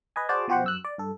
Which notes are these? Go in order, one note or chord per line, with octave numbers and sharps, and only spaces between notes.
B4 D#5 G#5
F#4 G#4 C5 D5 A5
B2 F3 F#4 G4 C5 F#5
F#2 E6 F#6
D5
G2 A4